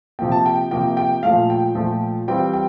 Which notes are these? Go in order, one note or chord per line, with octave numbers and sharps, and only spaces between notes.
C3 F3 A#3 G5
A5
G5
C3 F3 A#3 G5
G5
A#2 F3 A3 F5
G5
A#2 F3 A3
E3 G3 C4 F4 G5
G5